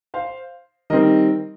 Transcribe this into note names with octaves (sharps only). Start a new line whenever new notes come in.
C5 F5
D#3 G3 C4 A#4 D#5